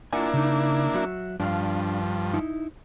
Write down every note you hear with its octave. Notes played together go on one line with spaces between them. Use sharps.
A#3 D4 E4 F4 F#5 G#5
C#3 D#4
F#3 F#4 E5
G2 F3 D4 F5
D#4 E4